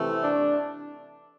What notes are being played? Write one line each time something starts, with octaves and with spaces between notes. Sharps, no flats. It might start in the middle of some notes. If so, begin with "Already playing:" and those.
Already playing: C3 E3 A3
D4